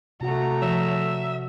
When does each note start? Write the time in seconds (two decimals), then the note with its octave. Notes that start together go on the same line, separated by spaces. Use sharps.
0.21 C3 A3 F#4 F#5 A#5
0.62 F3 E5